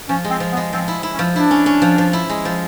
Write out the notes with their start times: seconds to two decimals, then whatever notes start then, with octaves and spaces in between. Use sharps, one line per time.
0.09 F3 C#4
0.25 G#3
0.30 C4
0.40 F3
0.52 B3
0.57 G#3
0.73 F3 C4
0.88 E4
1.03 E4
1.14 C#4
1.19 F3
1.35 D4 E4
1.51 C#4
1.66 C#4
1.82 F3
1.98 F3
2.13 E4
2.29 G#3
2.45 F3